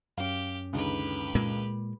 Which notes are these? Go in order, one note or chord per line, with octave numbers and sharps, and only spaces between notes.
F#2 C#4 G4 F5
C#2 D3 D#3 G4 B4
A#2 G#3 A#3